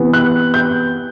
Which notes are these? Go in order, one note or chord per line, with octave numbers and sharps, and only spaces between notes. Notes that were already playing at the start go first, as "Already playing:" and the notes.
Already playing: C3 E3 B3
F#6
G6